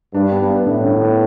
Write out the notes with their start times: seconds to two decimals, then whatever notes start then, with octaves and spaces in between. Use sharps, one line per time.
0.14 G2 D4
0.32 B3
0.50 B3
0.66 A2 D3
0.84 D3
1.01 B3